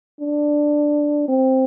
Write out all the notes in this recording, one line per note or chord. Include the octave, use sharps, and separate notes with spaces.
D4
C4